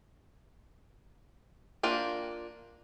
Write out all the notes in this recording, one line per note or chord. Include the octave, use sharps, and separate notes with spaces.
A#3 D4 F4 G5